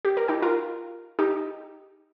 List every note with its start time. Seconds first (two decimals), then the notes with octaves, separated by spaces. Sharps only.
0.05 G4
0.17 A#4
0.28 D#4 G4
0.42 F4 A#4
1.19 D#4 G4